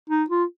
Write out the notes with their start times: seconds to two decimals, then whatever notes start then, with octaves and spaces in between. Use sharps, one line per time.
0.10 D#4
0.30 F4